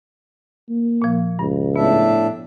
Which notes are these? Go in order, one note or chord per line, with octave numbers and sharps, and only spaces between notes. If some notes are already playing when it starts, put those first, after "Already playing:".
A#3
A#2 F3
C#2 G2
A2 B3 D4 E5